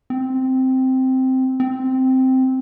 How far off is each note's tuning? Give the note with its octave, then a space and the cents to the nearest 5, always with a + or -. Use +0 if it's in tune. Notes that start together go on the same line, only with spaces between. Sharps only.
C4 -5
C4 -5